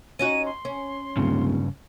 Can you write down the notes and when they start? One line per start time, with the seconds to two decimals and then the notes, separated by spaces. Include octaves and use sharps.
0.19 C#4 D#4 F#4 D#7
0.46 C6
0.65 C#4
1.17 D1 G2 C#3